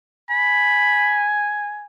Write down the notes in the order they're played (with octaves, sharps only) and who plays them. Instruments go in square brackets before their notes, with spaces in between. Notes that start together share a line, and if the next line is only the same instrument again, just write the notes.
[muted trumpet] G#5 [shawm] B5